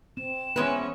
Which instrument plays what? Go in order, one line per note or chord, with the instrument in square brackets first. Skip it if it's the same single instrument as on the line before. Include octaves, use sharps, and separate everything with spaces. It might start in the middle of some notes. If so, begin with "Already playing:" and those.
[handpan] C4 [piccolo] E7
[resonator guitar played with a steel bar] E2 G#3 B4 [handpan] B3 [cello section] C#4